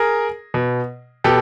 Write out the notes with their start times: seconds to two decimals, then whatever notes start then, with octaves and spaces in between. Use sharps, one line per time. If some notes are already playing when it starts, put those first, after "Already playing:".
Already playing: G#4 A#4
0.54 B2
1.24 B2 G4 A4